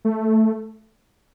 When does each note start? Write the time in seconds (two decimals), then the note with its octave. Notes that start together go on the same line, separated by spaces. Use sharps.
0.05 A3